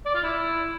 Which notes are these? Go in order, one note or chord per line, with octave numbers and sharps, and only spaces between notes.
D5
F4
E4